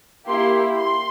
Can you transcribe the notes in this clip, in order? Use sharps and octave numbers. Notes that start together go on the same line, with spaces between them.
A#3 E4 G4 C6
C6